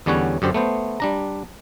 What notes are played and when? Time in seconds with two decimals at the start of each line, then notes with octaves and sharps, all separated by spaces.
0.06 E2 D3 G3 C#4 C#5 F#5
0.42 F#2 D3 G4 C5
0.54 A3 B3 C5
1.00 G3 D4 A#5